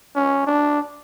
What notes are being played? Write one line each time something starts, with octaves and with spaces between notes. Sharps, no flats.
C#4
D4